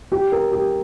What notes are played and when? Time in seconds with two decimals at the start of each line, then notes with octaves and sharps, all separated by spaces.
0.12 G4
0.32 A#4
0.52 G4